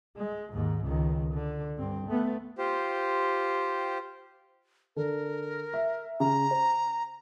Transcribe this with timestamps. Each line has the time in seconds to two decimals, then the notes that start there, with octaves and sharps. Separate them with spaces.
0.17 G#3
0.53 D#2 G#2
0.83 C#2 D#3
1.33 D3
1.77 G2 C4
2.08 A3 B3
2.58 F4 G4 C5
4.96 D3 A4 A#4
5.74 E5
6.20 C#3 A#5
6.51 C5